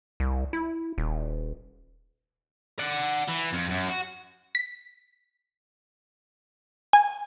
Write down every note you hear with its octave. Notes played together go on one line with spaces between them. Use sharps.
C2
E4
D#1
D5 F#5
E3
F2
F#2
F#4
B6
G#5